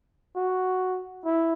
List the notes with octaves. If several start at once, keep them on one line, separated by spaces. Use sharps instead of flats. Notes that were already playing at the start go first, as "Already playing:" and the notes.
F#4
E4